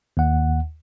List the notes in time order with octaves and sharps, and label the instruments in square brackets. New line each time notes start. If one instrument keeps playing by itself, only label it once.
[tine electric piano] D#2 F#5